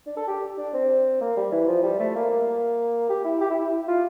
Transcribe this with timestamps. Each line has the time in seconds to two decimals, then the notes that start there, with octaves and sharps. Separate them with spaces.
0.07 D4
0.17 A4
0.27 G4
0.58 D4
0.74 C4
1.21 A#3
1.37 G3
1.52 E3
1.68 F3
1.83 G3
1.99 A3
2.15 A#3
2.31 A#3
3.09 G4
3.25 E4
3.41 G4
3.50 E4
3.61 E4
3.88 F4